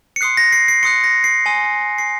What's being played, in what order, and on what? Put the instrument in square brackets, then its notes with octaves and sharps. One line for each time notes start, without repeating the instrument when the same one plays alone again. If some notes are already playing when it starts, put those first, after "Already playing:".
[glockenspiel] C#7
C6 D#6 F#6 C7
A#6
C7
C7
C6 D#6 F#6 C#7
A#6
C7
G#5 C6 D#6
C7